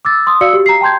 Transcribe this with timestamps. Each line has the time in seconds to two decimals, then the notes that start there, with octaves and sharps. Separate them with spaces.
0.05 D6 E6 A6
0.27 C6 D#6
0.41 F#4 D5 F5 E6 C#7
0.53 G4
0.66 A#5 C7
0.81 G5 A5 C6 G6 G#6